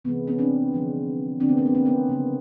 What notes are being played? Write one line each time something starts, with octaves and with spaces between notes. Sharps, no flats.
C3 E3 G#3 B3
B3 C#4
C4 D4
D3 F3 G#3
D3 F#3 A#3 C4 D4
B3 C#4
A#3 C4
B3
A#3 C4
B3 C#4
C#3 F#3 A#3